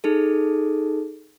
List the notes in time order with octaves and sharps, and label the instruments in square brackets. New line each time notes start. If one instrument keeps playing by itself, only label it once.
[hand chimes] D#4 G#4 A4